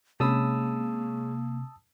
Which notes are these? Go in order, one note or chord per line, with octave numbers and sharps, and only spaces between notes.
C3 G#3 A#3 C#4 A5 B5 D#6 E6